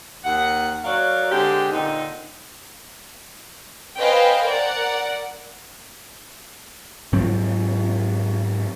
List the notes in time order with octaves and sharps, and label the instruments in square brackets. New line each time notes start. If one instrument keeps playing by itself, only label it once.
[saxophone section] D#2 F#5
F#3 F#4 A#4 C#5 D5 F5
D3 G#3 C4 G4
A#2 D3 C4 D#4
[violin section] B4 C5 D#5 F5 G5 G#5
A#4 D5 F#5
[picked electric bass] G#2 F#3 C4